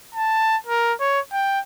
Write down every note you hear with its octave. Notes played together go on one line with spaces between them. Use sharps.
A5
A#4
C#5
G5